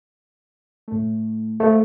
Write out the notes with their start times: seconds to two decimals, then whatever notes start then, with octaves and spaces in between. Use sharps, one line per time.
0.88 A2 A3
1.60 A3 A4 C5 F5